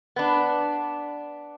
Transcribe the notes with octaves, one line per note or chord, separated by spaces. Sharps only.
B3 D4